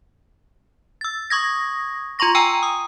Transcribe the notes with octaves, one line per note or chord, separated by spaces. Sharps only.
E6 A6
C#6 D#6 G#6 A#6
F4 A#5 C6 C#6 A#6
G5 G#5 A#5 E6 D#7
D#6